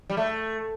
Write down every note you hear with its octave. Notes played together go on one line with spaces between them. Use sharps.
G3
A3